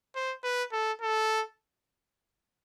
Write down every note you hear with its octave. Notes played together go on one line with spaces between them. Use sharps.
C5
B4
A4
A4